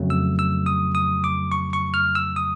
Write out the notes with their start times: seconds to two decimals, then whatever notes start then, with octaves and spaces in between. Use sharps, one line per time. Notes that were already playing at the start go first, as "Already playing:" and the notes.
Already playing: F2 C#3 F#3 A3
0.10 E6
0.39 E6
0.66 D#6
0.95 D#6
1.24 D6
1.52 C#6
1.73 C#6
1.94 F6
2.15 E6
2.36 D#6